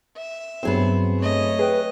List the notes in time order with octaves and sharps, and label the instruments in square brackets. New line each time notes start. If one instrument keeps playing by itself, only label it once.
[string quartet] E5
[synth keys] G2 F#3 C4 [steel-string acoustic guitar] B3 G#4 C5
[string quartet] A3 C#5 D#5
[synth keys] G#4 G5 [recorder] B4